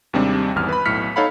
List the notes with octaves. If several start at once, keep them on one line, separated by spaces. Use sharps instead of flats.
D#2 C3 G3 G#3 C4 D4
G#1 E2 F6
B4 B5
B1 A2 F6 B6 C#7
D#4 A4 C#5 F5 F#5 B5